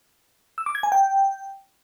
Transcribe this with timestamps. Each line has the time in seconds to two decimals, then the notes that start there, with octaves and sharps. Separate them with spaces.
0.58 E6
0.66 D6
0.75 G#6
0.83 G#5
0.92 G5